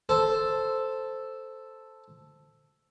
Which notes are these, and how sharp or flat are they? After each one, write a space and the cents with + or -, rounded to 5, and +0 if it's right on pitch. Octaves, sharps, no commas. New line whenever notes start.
A4 +0 C5 +0